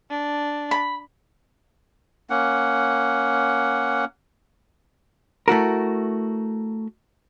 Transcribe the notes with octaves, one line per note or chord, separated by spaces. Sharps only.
D4
B5
A#3 C#4 F#5
A3 E4 F#4 A#4